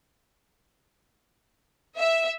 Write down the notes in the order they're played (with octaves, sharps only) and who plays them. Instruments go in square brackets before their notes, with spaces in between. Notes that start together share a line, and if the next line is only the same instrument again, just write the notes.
[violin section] E5